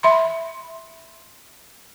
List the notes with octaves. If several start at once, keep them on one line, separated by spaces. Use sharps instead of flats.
E5 B5 C6